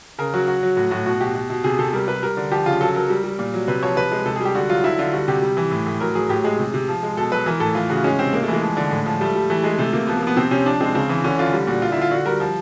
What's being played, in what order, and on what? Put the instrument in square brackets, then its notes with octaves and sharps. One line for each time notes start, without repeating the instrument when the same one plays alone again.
[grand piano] C#3 A#4
F#3 F#4
F#3 F#4
F#3
A2 F#4
A2 F#4
B2 F#4
B2 G4
B2
B2
C3 G#4
C3 A4
G3 A#4
G3 B4
G3 A#4
D3
F3 G4
C#3 F4
F#3 A4
F#3 A#4
G3
G3
A#2
F#3
C3 B4
F3 C#5
C3 B4
G#3
C3 A4
G#4
G3 G4
D3 F#4
F#3 F4
D3 E4
D3 F4
G3 F#4
C3 G4
G3
E3
A2
A2
F#3 A#4
F#3 G#4
A2 G4
G#3 G#4
C3
C3
F3
G#3
B2 A4
F#3 B4
E3 A#4
A2 A4
E3 F4
C#3 F#4
G#3 C#4
C3 C4
G#3 A#3
A3
E3 G#3
F3
D3
A2
F3
G3 A3
G3
E3 A3
G#3
C3 A3
C3 A#3
F3 B3
A#3
F3
B3
C3 C4
C3 C#4
F3 D4
G#3 C4
C#3 C4
E3
D3 C#4
D3 F4
G3
A#2 F#4
D3 F4
E4
D3 F4
D3 F#4
G3 A#4
F3